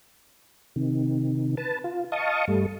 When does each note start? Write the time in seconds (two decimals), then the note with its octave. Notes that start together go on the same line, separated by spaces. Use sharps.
0.76 C3 D#3
1.57 B4 A5
1.84 F4
2.12 D#5 F5 A5 C#6 D#6
2.48 G2 G3 A3